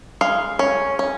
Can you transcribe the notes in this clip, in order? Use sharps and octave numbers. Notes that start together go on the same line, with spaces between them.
G#3 F5
C#4
C#4